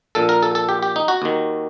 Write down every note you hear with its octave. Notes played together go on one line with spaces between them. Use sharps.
A#1 A#2 A4
A#4
A4
A4
G4
G4
D#4
F#4
D#2 D#3